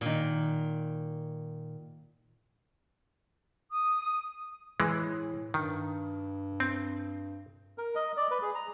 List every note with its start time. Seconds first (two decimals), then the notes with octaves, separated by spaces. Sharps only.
0.01 A#2 D#3
3.70 D#6
4.80 A2 E3 G#3
5.54 G2 D#3
6.60 C4
7.78 A#4
7.95 D#5
8.17 D5
8.31 B4
8.42 G#4
8.55 A#5